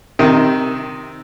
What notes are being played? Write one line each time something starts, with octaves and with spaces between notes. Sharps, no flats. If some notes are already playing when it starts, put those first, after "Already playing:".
C3 D#3